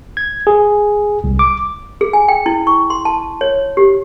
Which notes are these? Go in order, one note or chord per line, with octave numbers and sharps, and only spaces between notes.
G#6
G#4
C2
D6
G#4
G#5
G5
E4
C#6
C6
A5
C#5
G4